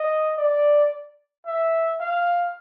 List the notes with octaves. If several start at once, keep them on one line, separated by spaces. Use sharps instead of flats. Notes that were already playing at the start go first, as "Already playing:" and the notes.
Already playing: D#5
D5
E5
F5